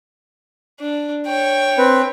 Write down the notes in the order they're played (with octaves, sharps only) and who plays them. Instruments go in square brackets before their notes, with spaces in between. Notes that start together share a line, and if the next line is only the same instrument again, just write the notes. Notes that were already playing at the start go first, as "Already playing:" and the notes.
[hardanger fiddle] D4
C#5 G5
[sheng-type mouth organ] C4 B4